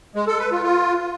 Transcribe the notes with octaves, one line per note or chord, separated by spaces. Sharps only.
G#3
A4
B4
F4
F4